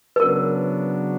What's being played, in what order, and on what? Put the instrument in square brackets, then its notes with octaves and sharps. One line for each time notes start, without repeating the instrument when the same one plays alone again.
[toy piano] B4
[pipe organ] C#3 F#3 B3 D4 [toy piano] A#4